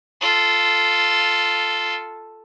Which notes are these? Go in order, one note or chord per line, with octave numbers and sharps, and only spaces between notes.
F4 A4